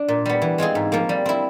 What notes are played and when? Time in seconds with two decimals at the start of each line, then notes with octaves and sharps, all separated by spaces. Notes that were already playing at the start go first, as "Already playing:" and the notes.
Already playing: D4
0.08 A#2
0.26 G3 B3
0.42 E3
0.58 G#3 C4 F4 G#4
0.75 G#2
0.92 F3 A#3
1.09 G3
1.26 C4 E4